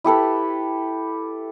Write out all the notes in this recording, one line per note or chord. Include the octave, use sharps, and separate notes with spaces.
E4 G4 A4 B4